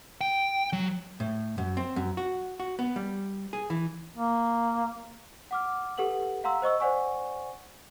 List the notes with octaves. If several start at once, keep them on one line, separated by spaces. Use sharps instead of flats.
G5
F#3
A2
F#2
C4
F#2
F#4
F#4
B3
G3
G#4
E3
A#3
F#5 D6 F6
G4 A4 B4 F#5 F#7
F5 F#5 A#5 C6 E6
C5 D#5 C#6 E6
C5 D5 F#5 G#5 C#6